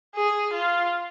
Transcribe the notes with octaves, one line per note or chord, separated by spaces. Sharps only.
G#4
F4